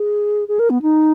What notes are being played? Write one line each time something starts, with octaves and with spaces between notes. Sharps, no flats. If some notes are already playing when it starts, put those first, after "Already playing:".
Already playing: G#4
G#4
A#4
B3
D#4